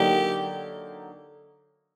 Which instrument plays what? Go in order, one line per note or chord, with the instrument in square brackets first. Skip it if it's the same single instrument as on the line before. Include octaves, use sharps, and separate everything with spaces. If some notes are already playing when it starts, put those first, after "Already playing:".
Already playing: [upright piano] D3 F#3 A#3 D#4 [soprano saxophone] G4